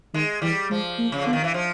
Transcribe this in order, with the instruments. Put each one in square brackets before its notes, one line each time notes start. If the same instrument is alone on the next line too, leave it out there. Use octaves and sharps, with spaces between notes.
[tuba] D#3 [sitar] G#3
[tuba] E3 [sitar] G3
[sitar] F3 [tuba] G#3
[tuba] A#3
[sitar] C#3
[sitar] D3 [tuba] B3
[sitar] D#3
E3
F3